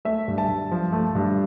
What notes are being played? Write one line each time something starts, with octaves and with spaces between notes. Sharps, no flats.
A3 E5
G2
A5
G2
F3
A3
G2